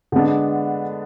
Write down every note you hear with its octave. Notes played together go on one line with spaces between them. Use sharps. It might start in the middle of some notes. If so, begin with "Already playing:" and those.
D3 G#3 B3 D4